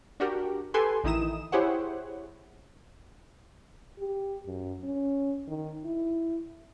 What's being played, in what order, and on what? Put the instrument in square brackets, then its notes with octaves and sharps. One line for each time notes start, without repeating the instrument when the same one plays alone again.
[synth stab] D4 F#4 G4 A#4
G4 A4 B4 G#5 C6
A1 D#3 D#4 E4 D#6 E7
E4 G4 G#4 C5 C#5 F#5
[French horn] G4
F#2
C#4
D#3
E4